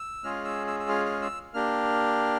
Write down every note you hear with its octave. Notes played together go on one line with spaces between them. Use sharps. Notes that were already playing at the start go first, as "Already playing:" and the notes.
Already playing: E6
G#3 C#4 F4 G#4 F6
E6
E6
E6
F6
F6
E6
A#3 D4 G4 F6